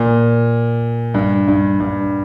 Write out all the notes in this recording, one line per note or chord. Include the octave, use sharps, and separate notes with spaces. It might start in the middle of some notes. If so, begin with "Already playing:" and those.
Already playing: A#2
G2
G2
G2